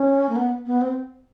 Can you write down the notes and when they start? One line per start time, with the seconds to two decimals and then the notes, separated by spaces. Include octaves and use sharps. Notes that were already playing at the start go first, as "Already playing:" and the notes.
Already playing: C#4
0.29 A#3
0.36 B3
0.66 B3
0.81 C4